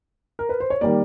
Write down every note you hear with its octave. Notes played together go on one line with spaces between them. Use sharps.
A#4
B4
C5
C#5
D#3 G3 A#3 D5